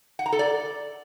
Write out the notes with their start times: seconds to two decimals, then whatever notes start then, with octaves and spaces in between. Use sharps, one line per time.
0.19 F#5
0.26 A#5
0.32 A4
0.39 D5